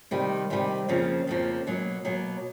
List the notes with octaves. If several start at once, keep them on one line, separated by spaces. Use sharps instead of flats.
C3 D#3 G3
C3 D#3 G3
F2 C#3 F3 A#3
F2 C#3 F3 A#3
B2 F#3 A#3
B2 F#3 A#3